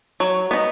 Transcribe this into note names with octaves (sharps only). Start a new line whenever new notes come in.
F#3
B3 D#4